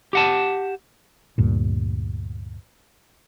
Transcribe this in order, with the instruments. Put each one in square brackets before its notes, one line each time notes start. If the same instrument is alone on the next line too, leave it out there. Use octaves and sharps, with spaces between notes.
[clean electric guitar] G4 F#5 A5
[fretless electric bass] D2 G2 A#2